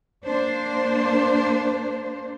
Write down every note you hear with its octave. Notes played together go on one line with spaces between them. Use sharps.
A#3 D4 C5